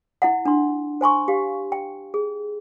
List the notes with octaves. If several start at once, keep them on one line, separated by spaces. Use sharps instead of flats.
E4 E5 F#5
D4 C6
C5 G#5 C6 C#6
G4 F5
G5
G#4